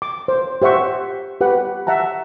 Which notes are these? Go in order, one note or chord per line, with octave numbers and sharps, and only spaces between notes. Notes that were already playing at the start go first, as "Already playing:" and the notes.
D6
C5
G4 C5 E5 F#5 C#6
G4 B4 F#5
E5 F#5 A5 A#5